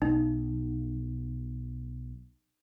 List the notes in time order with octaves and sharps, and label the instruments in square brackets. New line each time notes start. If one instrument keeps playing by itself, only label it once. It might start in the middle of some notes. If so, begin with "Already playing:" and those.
[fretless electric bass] B1 [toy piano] D#4